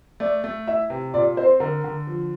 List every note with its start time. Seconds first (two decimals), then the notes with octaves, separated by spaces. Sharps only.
0.20 A3 D5
0.44 A3
0.67 E4 E5
0.90 C3
1.14 A#2 D5
1.37 C4 C5
1.60 D3 A#4
1.84 D3
2.07 F3